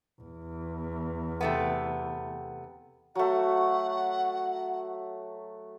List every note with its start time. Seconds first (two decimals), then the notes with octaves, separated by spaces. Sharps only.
0.21 E2
1.41 C3 A3 B3
3.15 F#3 A3 F#5